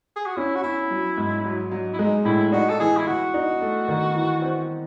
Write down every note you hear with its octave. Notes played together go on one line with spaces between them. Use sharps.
G#4
F#4
C#4 E4
F#4
C#4 E4
F#3
G#2
F#3
F#3
E4
G#3 D#4
A2 E4
D#4 F#4
A4
E3 G#4
E4
E3 F#4
D#4
A3
D#3
E3
C4